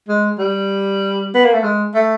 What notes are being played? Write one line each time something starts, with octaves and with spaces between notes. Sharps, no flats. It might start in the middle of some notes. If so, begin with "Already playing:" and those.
G#3
G3
B3
A#3
A3
G#3
A3